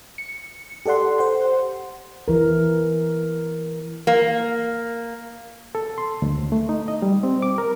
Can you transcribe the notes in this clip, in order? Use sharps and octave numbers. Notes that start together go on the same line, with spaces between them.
C#7
G4 A4 D5 F#5 C6
C5 F#5 C6
E3 A#4
A#3
A4
C6
D2
A3
D#4
D#5
G3
C4
D6
A#4